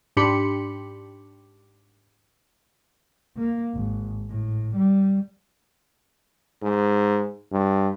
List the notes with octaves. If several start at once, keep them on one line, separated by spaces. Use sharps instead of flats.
G#2 D4 G4 B5 C6 C#7
A#3
G#1
A2
G3
G#2
G2